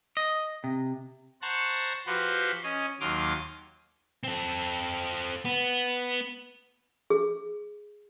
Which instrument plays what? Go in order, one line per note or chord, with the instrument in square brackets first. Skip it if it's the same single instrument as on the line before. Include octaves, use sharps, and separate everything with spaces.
[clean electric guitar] D#5
C3
[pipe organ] C5 F#5 A5 A#5 C#6
F3 F#4 G4 B4 B5 C6
C#4 C#5 D#5
D#2 F#3 C6 D6 D#6 F6
[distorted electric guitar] C4 A4
B3
[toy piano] G#4